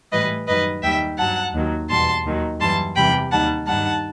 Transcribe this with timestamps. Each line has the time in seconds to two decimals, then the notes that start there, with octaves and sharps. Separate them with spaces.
0.12 A2 E3 G3 B4 D#5
0.47 F#2 D#3 G3 B4 D#5
0.83 D#2 D#3 G3 E5 G5
1.18 G2 F#3 F#5 A5
1.53 D#2 D#3 F#3
1.90 E2 B2 G3 A5 C6
2.25 D#2 D#3 F#3
2.60 F#2 E3 G3 A5 C6
2.96 E2 C3 E3 G3 G5 B5
3.32 D#2 D#3 G3 F#5 A5
3.67 G2 D#3 G3 F#5 A5